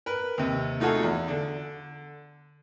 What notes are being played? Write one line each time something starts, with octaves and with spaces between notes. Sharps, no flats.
A#4 B4
D#2 C3
A3 D#4 F4 F#4 G#4 A4
E2
D3